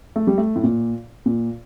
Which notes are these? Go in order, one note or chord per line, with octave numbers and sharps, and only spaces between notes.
A3
G3
A3
A2
A#2
A#2